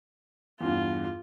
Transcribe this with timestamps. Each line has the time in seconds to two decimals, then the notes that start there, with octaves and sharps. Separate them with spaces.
0.61 E2 G2 F4